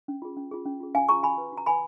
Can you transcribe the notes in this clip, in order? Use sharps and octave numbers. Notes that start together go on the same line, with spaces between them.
C#4
F4 G#4
C#4
F4 G#4
C#4
F4 G#4
C#4 F5 G#5
F4 G#4 A#5 C#6
F#4 G#5 B5
B4
F#4
A#5
B4 G#5 B5